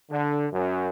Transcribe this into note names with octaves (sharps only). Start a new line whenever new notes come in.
D3
F#2